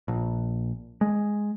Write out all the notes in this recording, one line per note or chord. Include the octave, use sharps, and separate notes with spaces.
A#1
G#3